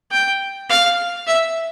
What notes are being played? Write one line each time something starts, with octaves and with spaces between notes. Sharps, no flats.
G5
F5
E5